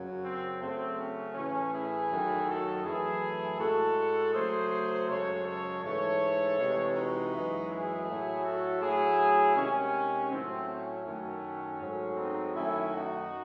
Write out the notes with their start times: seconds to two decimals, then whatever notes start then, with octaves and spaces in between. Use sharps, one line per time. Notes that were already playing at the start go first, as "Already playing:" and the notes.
Already playing: F#2 C#3 F#3
0.23 C4
0.60 C#3 F#3 A3 C4
0.97 C#4
1.34 A2 E3 A3 C#4
1.72 E4 G#4
2.10 F#2 D#3 F#3 A3
2.47 F#4 A4
2.83 F#2 E3 A3 E4 G#4
3.58 A2 G#3 F#4 A4
4.33 C#3 F#3 A3 G#4 C5
5.07 F#2 C#3 G#3 A4 C#5
5.44 A4 C#5
5.82 G#2 E3 A3 A4 C#5
6.57 C3 E3 G#3
6.94 D#4 F#4
7.31 F#2 E3 G#3
7.68 E4 G#4
8.06 A2 F#3 A3
8.44 F#4 A4
8.80 A2 F#3 A3 E4 G#4
9.54 C3 D#3 G#3 C#4
10.30 A2 F#3 A3 C4
10.67 C#4
11.04 F#2 D#3 F#3 A3
11.78 G#2 F#3 A3
12.15 C4 D#4
12.53 F#2 D#3 A3 C#4 E4
12.90 D#4 F#4